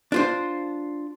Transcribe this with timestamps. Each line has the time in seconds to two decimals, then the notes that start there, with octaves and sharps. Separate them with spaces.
0.12 D4 F4 C5